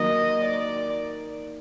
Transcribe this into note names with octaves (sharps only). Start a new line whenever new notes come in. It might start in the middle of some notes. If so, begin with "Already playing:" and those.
Already playing: D#3 F#3 A#3 D#4 D#5
D5